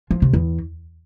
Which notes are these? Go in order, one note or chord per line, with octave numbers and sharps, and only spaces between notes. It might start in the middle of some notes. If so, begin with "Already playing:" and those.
F3
C3
E2